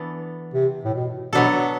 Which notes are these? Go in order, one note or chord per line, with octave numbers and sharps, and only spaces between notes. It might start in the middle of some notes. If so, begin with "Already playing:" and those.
Already playing: E3 B3 D4 A4
C3
A2
B2
B2 F#3 B3 D4 A4